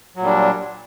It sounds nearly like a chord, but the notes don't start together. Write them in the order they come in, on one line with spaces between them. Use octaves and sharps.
F#3 A#2 G3 D4